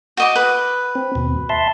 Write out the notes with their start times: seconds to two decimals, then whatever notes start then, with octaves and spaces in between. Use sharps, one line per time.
0.17 F#4 D#5 D6
0.36 B4
0.95 C4
1.15 D#2 B2
1.49 E5 A5 C6